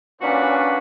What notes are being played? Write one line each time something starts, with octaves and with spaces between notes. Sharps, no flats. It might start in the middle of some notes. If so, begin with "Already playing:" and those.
A#2 C#4 D4 F#4 B4